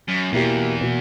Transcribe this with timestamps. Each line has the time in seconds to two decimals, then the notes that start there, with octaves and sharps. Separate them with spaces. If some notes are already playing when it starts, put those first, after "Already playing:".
0.08 F#2
0.32 E2 B2 A#3 E4 G4
0.81 B2 A#3